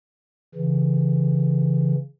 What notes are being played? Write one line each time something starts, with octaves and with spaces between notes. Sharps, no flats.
C#3 E3